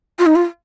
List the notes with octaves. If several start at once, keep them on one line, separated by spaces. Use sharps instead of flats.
F4
D#4
F4